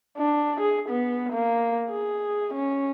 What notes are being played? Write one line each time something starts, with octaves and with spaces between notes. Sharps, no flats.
D4
G#4
B3
A#3
G#4
C#4